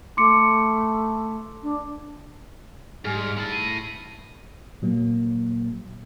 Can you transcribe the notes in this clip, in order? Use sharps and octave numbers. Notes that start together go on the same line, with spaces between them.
A3 C6 D6 C#7
D4
G#2 G3 G#4 F6
E4 A5
D#7
A#2 F#3 A#3